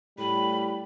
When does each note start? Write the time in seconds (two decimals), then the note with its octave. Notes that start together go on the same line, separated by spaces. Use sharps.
0.18 A2 G3 B5